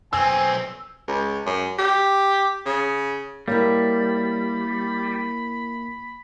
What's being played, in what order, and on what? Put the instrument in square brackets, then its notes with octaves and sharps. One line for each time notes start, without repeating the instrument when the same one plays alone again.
[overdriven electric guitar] B1 C4 [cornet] G#5 [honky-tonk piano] E6
[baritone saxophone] C#2
F#2
G4
C#3
[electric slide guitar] G3 [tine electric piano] A#3 [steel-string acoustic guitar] E4 A#4 C#5 [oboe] B5